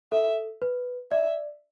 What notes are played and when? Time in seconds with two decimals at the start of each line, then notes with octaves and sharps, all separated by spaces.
0.12 A4 E5
0.62 B4
1.11 D5 E5